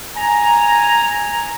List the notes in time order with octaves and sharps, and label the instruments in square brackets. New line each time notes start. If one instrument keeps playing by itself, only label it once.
[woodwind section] G#5 A#5